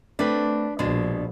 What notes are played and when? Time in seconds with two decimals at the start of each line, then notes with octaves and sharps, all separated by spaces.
0.19 A3 C4 D4 B4
0.79 A#1 B2 G#3 D4